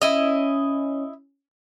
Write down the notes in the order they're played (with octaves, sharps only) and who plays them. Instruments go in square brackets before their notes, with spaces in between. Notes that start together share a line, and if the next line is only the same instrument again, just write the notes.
[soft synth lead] C#4 [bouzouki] E4 D#5